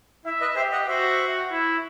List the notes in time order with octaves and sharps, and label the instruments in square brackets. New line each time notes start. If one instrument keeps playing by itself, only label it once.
[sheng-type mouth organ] E4 [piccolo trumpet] E5
[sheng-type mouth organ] B4 D#5
[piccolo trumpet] G4 [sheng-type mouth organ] C5 E5
[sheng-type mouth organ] D#5 F#5
[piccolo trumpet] F#4 [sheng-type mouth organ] C5 E5
[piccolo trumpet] E4